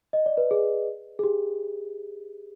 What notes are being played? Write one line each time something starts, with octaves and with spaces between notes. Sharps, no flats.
D#5
D5
B4
G#4
G#4
G4